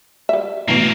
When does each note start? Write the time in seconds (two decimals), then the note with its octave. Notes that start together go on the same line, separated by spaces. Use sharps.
0.29 G3 E5
0.68 A1 B2 A#3 C4